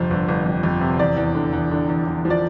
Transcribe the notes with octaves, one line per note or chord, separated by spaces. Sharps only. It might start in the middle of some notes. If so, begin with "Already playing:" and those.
Already playing: G1 F2 C3 C5
G1
G1
F2
F2
C3
E2 D5
E2
D3
E2
D3
E2
E2
F3
D5